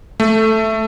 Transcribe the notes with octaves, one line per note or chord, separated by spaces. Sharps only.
A3